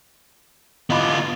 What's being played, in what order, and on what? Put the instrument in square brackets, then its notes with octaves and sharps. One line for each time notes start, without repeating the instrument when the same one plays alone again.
[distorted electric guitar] B3 F4 [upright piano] D#5 B5 D6